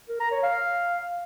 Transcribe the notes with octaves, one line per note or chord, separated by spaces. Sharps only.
A#4
A#5
C#5
F5